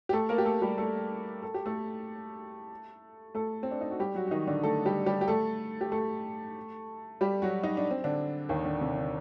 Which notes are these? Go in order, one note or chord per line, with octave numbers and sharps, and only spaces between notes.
G4
A3 A4
A#3 A#4
G4
A3 A4
G3 G4
A3 A4
A4
G4
A3 A4
A3 A4
C4
D4
D#4
F#4
G3 G4
F#3 F#4
F#4
D#3 D#4
D3 D4
A3 A4
G3 G4
G3 G4
G4
A3 A4
G4
A3 A4
G3 G4
F#3 F#4
D#4
D4
C4
D3 D4
D#2 D#3
D3
C3
D3